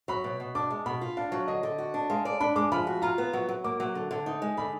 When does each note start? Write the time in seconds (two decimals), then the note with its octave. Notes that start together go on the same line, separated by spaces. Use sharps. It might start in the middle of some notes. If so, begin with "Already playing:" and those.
0.08 F#3 B5
0.24 B2
0.40 B2
0.55 D4 D6
0.70 G#3
0.86 B2 B5
1.01 F4
1.17 D4 F5
1.32 F#3
1.48 D3 D#5
1.63 D3
1.78 F#4
1.94 D4
2.10 G#3 F5
2.25 D5
2.40 D4 B5
2.56 G#3 D6
2.72 F3 B5
2.87 F#4
3.02 F4 A#5
3.18 B3
3.33 F#3
3.49 F#3
3.64 A#3 D6
3.80 F#3
3.95 D3
4.11 D3
4.26 D#4
4.42 G#3
4.57 D3 B5